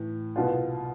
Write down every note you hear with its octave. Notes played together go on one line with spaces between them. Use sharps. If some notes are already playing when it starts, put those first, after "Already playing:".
Already playing: A2 E3
C2 B2 B3 F4